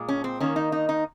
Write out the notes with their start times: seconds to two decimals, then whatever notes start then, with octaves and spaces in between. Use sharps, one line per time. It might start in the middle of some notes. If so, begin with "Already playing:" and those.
Already playing: A#2 G#3
0.09 C#4
0.24 C4
0.40 D#3 A#3 C#4
0.56 D#4
0.72 D#4
0.89 D#4